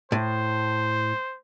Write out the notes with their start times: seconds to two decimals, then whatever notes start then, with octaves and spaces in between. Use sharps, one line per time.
0.12 A2 C5